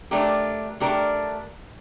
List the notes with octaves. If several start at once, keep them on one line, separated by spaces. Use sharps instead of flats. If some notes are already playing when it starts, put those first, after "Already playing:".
A3 D4 G4 A#4
A3 D4 G4 A#4